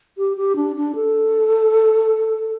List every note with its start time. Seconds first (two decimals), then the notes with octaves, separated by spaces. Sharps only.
0.18 G4
0.37 G4
0.56 D4
0.76 D4
0.95 A4